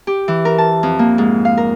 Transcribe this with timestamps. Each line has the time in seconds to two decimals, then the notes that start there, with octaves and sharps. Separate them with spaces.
0.07 G4
0.28 E3
0.45 A#4
0.58 A5
0.83 F2
0.99 A#3
1.18 G#2
1.45 F5
1.57 A#4